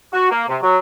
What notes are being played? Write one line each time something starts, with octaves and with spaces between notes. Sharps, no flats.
F#4
A#3
C3
F#3